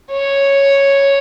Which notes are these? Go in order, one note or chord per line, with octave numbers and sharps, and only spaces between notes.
C#5